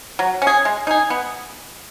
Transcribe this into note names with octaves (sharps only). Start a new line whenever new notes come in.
F#3
C#4
G#4
G#3
D#4 G#4
B3